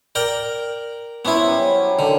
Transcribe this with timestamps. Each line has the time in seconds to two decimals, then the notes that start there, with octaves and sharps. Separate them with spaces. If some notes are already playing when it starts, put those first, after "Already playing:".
0.15 A#4 D5 G5
1.25 B3 C#4 E4 B4 C5
1.41 F#3 G3
1.99 D3 D#3